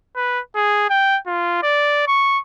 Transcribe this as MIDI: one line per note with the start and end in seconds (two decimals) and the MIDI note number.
0.16 0.40 71
0.55 0.85 68
0.90 1.18 79
1.27 1.58 65
1.63 2.03 74
2.07 2.39 85